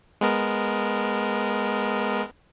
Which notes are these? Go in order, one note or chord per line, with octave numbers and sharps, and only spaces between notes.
G#3 B3 A#4